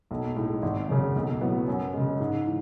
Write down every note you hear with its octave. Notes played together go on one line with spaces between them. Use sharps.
B1
A2 G#3 D#4
G#1
F#2 C#3
B1
A2 F#3 B3
F#2
C#3 G#3
G#2
E3